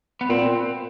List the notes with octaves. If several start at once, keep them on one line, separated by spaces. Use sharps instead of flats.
B3
A#2 C4